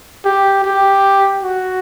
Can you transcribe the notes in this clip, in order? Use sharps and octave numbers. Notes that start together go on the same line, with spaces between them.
G4
G4
F#4